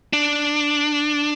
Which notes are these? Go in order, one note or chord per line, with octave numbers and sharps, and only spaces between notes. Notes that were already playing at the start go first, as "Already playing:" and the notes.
D4